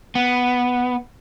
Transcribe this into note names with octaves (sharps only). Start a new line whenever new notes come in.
B3